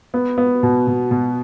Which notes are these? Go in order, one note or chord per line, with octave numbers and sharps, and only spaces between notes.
B3
B3
B2
B2
B2